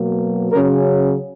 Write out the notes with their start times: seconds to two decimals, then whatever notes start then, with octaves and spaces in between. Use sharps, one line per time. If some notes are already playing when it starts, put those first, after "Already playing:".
Already playing: B2 F#3 A#3
0.51 C#3 F#3 C#4 A#4